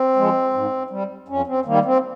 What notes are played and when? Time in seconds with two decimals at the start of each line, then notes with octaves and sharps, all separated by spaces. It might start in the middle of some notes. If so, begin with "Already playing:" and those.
Already playing: C4
0.16 F3 G#3
0.53 G#2
0.90 G3
1.28 F2 C#4
1.47 C4
1.65 D#3 G3 A#3
1.85 C4